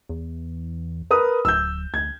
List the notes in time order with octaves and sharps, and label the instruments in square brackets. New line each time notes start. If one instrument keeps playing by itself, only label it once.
[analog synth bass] E2
[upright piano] A#4 B4 D#6
[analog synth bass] D1 [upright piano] E6 G6
[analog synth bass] D2 [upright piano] G#6